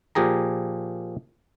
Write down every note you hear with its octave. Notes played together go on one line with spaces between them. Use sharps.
A#2 F3 G4 G#4 A#5